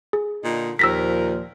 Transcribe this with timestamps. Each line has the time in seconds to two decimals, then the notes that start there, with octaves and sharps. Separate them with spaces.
0.13 G#4
0.44 A#2 D3 D#4
0.79 D#2 A#2 F3 A#4 E6 A#6 B6